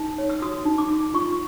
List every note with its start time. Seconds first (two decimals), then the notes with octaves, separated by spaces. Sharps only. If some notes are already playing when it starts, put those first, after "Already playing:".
Already playing: D#4
0.18 C#5
0.30 E6
0.42 F#4 D#6
0.65 D#4
0.78 D6
0.91 D#4
1.14 F4 C#6